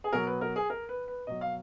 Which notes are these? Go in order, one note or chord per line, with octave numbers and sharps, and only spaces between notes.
G#4
B2 F#3 A#4
B4
A#4
G#4
A#4
B4
B4
B2 F#3 D#5
F5